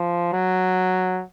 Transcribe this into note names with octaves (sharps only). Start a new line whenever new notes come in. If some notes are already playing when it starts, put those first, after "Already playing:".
Already playing: F3
F#3